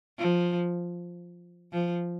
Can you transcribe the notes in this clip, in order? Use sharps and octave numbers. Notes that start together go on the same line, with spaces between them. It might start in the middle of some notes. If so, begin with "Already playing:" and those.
F3
F3